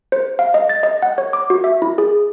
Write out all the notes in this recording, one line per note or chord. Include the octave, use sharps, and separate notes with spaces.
C5
F5
D#5
A6
D#5
F#5
C#5
D6
F#4
E5
E4
G#4